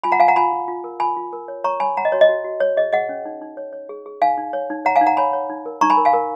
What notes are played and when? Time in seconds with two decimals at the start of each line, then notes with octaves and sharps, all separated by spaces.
0.04 F4 G#5 B5
0.12 F#5 A#5
0.20 F4 F5 G#5
0.28 F#5 A#5
0.36 F4 G#5 B5
0.53 F4
0.68 F4
0.84 A#4
1.00 F4 G#5 B5
1.17 F4
1.33 A#4
1.48 C#5
1.64 C#5 A#5 C#6
1.80 C#5 G#5 B5
1.97 C#5 F#5 A#5
2.05 D#5
2.12 F#4 C#5
2.21 D#5
2.29 F#4
2.44 F#4
2.60 C#5
2.77 G#4 D#5
2.93 G#4 D#5 F#5
3.09 C#4
3.25 D#4
3.42 D#4
3.57 C#5
3.73 C#5
3.89 G#4
4.06 G#4
4.22 D#4 F5 G#5
4.37 D#4
4.53 C#5
4.70 D#4
4.85 C#5 F#5 A#5
4.96 F5 G#5
5.01 D#4
5.06 F#5 A#5
5.17 C#5 G#5 B5
5.33 C#5
5.50 D#4
5.66 A#4
5.81 D#4 A#5 C#6
5.90 G#5 B5
5.97 A#4
6.05 F5 G#5
6.13 A#4